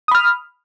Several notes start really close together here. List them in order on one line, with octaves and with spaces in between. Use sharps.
D#6 B5 F6